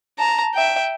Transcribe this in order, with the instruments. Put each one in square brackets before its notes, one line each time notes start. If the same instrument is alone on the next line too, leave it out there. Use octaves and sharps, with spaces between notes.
[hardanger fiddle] A5 A#5
E5 G5